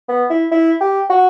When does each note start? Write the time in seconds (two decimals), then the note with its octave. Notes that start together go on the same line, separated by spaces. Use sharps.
0.09 B3
0.30 E4
0.52 E4
0.80 G4
1.10 F#4